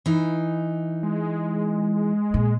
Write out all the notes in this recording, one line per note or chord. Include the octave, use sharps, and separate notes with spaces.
E3 D#4
G#3
A#2